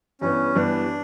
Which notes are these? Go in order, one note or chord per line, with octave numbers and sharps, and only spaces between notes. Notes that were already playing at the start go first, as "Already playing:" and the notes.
G2 E3 G3 B3 C#4
G2 E3 G3 B3 D4